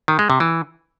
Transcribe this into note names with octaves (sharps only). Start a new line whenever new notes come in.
D#3
G#3
C3
E3